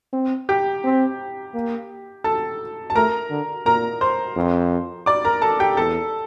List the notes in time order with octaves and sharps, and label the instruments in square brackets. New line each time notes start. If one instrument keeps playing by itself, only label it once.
[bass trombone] C4
[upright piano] G4 G5
[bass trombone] C4
A#3
[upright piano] A4 A5
A5
[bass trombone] A3 [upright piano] A#4 A#5
[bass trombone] D3
[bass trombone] A#2 [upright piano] A#4 A#5
[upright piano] C5 C6
[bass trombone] F2
[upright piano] D5 D6
A#4 A#5
A4 A5
G4 G5
[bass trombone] E2 [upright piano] A4 A5